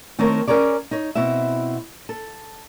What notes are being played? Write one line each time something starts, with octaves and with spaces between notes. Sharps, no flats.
D#3 A3 C4 A4 A#4 C#5
C#4 G#4 A#4 C#5 D5
D#4 C#5
B2 C4 E4 E5
A4